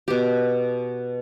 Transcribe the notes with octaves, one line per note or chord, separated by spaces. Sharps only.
B2 G4